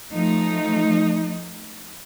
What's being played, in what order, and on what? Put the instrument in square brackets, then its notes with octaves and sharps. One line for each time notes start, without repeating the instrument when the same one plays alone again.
[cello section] F3 A3 D#4